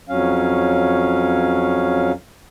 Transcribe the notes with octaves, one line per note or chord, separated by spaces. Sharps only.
F2 F#3 C#4 F5